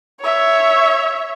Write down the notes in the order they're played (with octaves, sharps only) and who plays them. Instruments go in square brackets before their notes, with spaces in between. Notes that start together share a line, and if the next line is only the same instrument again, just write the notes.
[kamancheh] C#5 E5